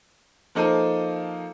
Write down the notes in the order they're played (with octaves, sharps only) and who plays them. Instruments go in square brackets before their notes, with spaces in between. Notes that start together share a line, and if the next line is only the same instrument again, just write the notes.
[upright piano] F3 A#3 D#4 A4 D#7